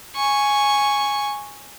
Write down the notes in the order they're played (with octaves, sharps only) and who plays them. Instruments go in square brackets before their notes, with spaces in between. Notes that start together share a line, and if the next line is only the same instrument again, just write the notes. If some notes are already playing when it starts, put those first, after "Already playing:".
[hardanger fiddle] G#5 C#6